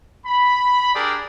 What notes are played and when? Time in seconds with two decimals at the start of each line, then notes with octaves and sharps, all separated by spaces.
0.25 B5
0.93 D4 G4 G#4 A#4 D5